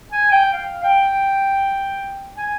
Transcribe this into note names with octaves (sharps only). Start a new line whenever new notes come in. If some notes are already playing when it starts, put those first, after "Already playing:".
G#5
G5
F5
G5
G#5